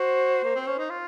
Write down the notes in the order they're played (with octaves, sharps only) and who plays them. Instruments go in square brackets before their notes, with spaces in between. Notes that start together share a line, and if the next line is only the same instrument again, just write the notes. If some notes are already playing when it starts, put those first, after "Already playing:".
Already playing: [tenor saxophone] F#4 [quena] C5
[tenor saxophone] A#3
C4
C#4
D#4
F4